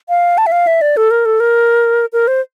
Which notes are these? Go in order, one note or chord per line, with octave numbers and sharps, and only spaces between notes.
F5
A5
E5
F5
E5
D5
A4
A#4
A4
A#4
A#4
C5